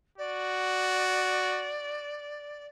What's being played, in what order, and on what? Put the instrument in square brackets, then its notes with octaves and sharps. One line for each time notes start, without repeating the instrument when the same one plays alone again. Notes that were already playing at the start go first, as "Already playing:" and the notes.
[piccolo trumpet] F#4 [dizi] D5